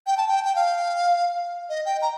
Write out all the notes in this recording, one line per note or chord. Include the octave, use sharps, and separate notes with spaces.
G5
A5
G5
G5
F5
D#5
G5
A#5